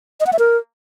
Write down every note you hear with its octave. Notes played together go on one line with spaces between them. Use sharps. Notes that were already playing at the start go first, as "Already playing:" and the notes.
D#5
F#5
E5
A#4